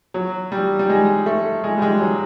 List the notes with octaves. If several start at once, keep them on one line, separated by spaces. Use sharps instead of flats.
F#3
G3
G3
G#3
A3
G#3
G3
G#3
F#3